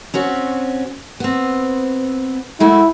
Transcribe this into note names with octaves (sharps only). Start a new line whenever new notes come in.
C4 C#4 F#4
B3 C4
G#3 A3 E4 F#4